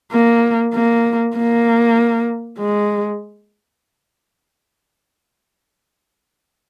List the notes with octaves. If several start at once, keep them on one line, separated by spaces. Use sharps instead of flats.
A#3
A#3
A#3
G#3